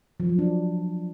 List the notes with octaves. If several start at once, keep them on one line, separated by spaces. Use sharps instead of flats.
F3
F#3
D4